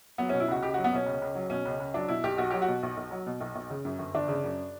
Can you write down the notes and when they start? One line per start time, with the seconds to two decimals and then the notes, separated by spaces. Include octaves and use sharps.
0.18 F#3 B3
0.29 B2 C#4
0.40 E4
0.48 C#2 F#4
0.62 C#2 G4
0.74 F#3 F#4
0.84 B3
0.92 B2 C#4
1.06 C#2
1.22 C#2
1.35 F#3
1.50 B2 C#4
1.65 C#2
1.80 C#2
1.94 F#3 D4
2.08 B2 E4
2.24 B1 G4
2.38 B1 F#4
2.50 F#3 G4
2.62 F#4
2.68 B2
2.83 B1
2.97 B1
3.11 F#3
3.26 B2
3.41 B1
3.55 B1
3.70 C#3
3.85 F#2
3.99 G1
4.15 G1 D4
4.28 C#3
4.44 F#2